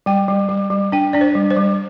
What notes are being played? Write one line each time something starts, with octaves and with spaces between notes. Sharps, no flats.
G3 G5
G3
G3
G3
D4 G5
D4 D5
C5
G3
C5
G3